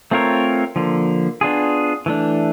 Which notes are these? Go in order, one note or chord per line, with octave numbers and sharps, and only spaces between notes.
A3 C4 F4 A#4 C#5
D3 F3 A#3
B3 D4 F4 G#4
E3 A3 D4